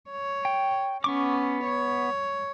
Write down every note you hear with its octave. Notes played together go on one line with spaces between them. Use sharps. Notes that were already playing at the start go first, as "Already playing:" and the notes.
C#5
G5
B3 C#4 C#6 D6
C#5